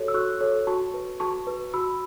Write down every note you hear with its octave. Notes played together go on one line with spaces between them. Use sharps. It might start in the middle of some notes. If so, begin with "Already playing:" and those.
Already playing: F#4 A4 C#5
E6
F#4 C#6 F#6
A4 C#5
F#4 A5 C#6
B4
F#4 A5 C#6
B4
F#4 B5 E6